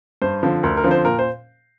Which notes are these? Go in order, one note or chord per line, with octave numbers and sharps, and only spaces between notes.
G2 C5
D3 F3 C4
D2 A#4
A#4
D3 F3 C4
C5
A#2 A#4
C5